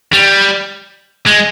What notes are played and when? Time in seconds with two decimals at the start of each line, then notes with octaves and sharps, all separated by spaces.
0.13 G3
1.26 G#3